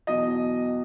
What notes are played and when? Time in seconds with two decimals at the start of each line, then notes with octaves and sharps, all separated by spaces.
0.07 E2 B2 F#3 D#5